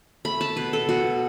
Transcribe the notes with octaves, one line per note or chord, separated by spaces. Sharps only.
A3 B5
A5
B2 B4
A4
B2 F#4